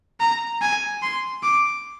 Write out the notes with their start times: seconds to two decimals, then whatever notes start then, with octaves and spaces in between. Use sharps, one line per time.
0.20 A#5
0.62 G#5
1.03 C6
1.43 D6